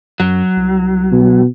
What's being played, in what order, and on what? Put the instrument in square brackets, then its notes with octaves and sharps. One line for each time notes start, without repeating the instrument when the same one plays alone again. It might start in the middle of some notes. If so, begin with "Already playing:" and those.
[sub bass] F#2 [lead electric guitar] F#3
[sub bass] C2
[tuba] B2